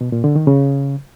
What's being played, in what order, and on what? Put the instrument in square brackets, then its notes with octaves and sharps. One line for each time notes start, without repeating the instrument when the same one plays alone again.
[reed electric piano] B2
A#2
D3
D#3
C#3